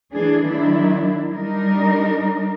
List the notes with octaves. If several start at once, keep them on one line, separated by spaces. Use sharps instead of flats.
E3 A3 D4 G#4
D#3 F#3 D4 E4
G3 D4 D#4 A#4